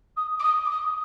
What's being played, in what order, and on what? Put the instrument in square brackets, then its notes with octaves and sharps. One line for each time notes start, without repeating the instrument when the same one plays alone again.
[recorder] D#6
D6
D#6
D6
D#6